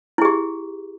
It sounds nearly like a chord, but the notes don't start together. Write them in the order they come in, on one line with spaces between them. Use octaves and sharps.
E4 G#4 G4